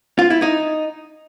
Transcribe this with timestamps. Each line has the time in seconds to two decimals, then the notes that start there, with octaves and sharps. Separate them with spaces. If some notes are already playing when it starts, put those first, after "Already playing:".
0.19 F4
0.30 E4
0.42 D#4